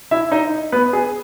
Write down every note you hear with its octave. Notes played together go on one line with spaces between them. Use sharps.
E4 E5
D#4 D#5
B3 B4
G#4